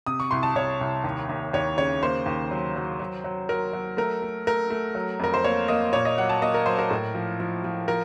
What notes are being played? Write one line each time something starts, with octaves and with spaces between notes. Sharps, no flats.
C3 D#6
C#6
C2 C6
A5
C2 C#5
C2
D#2
D#2
D#2 C#5
C#3 C#5
A#3 C5
D#2
F#3
F#3
F#3
F#3
F#3 A#4
F#3
A3 A#4
A3
A3 A#4
A3
F#3
F2 A#4
C5
A#3 C#5
A#3 D#5
A#2 C#5
D#5
F#3 F#5
A5
A#3 D#5
A#4
F#3 C5
A#4
A2
F3
F3
F3
F3 A#4